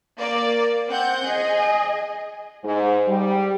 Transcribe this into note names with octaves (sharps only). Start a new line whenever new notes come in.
A#3 D5
C4 F#5 G6
G#4 D#5 G#5
G#2
G3